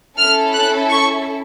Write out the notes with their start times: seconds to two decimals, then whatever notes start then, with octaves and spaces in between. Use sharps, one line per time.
0.18 C#4 E4 A4 F6
0.54 F#6
0.90 C#6